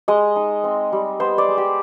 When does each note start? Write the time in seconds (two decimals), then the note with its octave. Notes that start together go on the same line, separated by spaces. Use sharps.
0.08 G#3 D#5
0.36 D#4
0.64 C4
0.92 G3
1.20 B3 C5
1.38 D5
1.48 G#3
1.58 G4